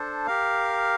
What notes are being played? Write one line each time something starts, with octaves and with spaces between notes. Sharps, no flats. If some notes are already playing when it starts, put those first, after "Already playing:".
Already playing: D4 A4 C5
G4 A#4 F5